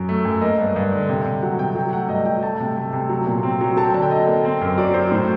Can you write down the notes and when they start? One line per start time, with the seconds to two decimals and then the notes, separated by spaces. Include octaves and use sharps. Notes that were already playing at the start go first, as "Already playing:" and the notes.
Already playing: F#2 F#3
0.09 A3
0.25 F#2
0.41 A#3 D#5
0.58 G2
0.76 G2
0.93 D3
1.09 C3
1.26 C3
1.42 F#3 F#5
1.59 C3 G5
1.75 F#3 G5
1.93 A3 F#5
2.09 G2 D#5
2.26 F#3 G5
2.43 A3 A5
2.60 C3
2.76 A3
2.93 C3
3.09 F#3
3.26 A#2
3.43 C4
3.61 F#3
3.77 F#3 A5
3.85 G5
3.94 D3 A5
4.02 G5
4.10 D3 D#5
4.27 A#3
4.45 C4
4.61 F#2
4.78 F#3 D5
4.94 F#3 C5
5.12 A2